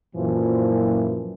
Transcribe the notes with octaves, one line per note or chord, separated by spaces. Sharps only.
F#2 A#2 E3 F3